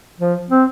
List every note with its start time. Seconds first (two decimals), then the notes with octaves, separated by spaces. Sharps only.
0.20 F3
0.50 C4